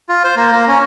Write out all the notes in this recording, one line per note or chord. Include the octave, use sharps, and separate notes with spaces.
F4
C5
A#3
A#3
C#4